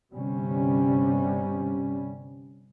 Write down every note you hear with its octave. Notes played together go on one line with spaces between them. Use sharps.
G1 C3 G3 C#4